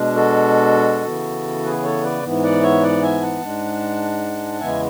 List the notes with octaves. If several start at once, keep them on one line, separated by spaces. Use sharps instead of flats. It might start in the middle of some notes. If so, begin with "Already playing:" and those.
Already playing: B2 G#3 D4
F#4 A4
C#3 E3 B3
G#4 B4
A4 C#5
B4 D5
G#2 E3 B3
D5 F#5
C#5 E5
D5 F#5
E5 G#5
F#5 A5
G#2 G#3 D4
E2 C#3 E3 G#3 B3 E5 G#5